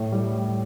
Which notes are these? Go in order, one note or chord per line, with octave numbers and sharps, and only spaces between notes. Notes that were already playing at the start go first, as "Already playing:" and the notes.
Already playing: A2
G3